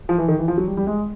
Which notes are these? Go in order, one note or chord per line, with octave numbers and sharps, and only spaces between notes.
F3
E3
D#3
E3
F3
F#3
G3
G3
G#3